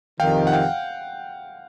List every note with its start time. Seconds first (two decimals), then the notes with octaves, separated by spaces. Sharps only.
0.20 F2 C3 D#3 F5 G5
0.47 F#5
0.53 F5 G5